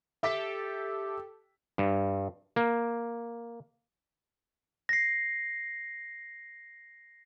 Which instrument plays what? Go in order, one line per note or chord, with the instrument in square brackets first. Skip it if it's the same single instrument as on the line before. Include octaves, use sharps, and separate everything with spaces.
[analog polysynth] G4 A4 [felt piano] E5 D6 B6
[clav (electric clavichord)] G2
A#3
[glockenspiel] A#6 C7